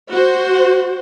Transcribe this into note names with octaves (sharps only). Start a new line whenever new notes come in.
F#4 C5